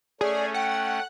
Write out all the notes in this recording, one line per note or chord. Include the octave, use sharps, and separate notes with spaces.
A3 C#4 G#4 D5
F#5 G5